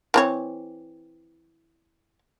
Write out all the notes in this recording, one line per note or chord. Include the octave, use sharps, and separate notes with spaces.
E3 C4 C#5